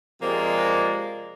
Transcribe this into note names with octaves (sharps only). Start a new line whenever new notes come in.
C3 F3 G#3 A#3 C4 D5